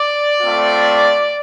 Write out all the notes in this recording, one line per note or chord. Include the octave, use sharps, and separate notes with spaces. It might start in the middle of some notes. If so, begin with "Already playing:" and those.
Already playing: D5
A3 C4 F4